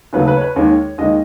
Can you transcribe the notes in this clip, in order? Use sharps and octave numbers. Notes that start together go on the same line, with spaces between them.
D#2 C#3 F#3 A3 B4
B4
C#5
B4
D#2 D#3 G#3 C#5
D#2 D#3 G#3 D#5